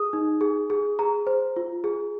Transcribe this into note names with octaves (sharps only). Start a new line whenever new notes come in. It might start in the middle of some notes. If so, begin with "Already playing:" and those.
Already playing: G#4 D#6
D#4
G#4
G#4
G#4 A#5
C5
F4
G#4